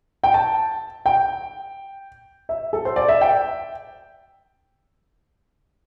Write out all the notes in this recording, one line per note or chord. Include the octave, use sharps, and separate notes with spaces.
G5
A5
G5
E5
A4
C5
D5
E5
G5